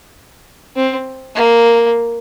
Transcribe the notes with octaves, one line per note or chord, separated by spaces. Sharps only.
C4
A#3